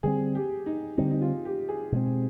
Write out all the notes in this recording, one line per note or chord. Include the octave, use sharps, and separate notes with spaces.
D3 G3 C4 G#4
G4
D#4
D3 G3 C4 D#4
D#4
F4
G4
G#4
B2 G#3 C4